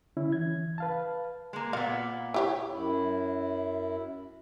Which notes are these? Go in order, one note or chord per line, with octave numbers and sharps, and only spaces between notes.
D3 C#4 E4
E3 G#6
B4 F5 A5
G#3 A#3
A#2 B3 F5
E4 G4 C#5
F#2 E4